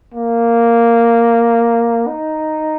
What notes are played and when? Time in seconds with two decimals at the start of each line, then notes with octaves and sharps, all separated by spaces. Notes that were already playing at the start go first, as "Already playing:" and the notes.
0.14 A#3
2.07 D#4